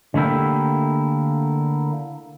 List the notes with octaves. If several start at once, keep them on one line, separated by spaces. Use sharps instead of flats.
D3 A3 A#3 E4 G4